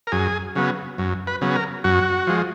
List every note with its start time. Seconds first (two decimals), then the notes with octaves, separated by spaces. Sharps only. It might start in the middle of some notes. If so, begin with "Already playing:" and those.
0.07 A#4
0.12 F#2 G#4
0.56 C#3 F#3 B3
0.98 F#2
1.27 B4
1.41 C#3 F#3 B3
1.55 A#4
1.84 F#2 F#4
2.27 F3 G#3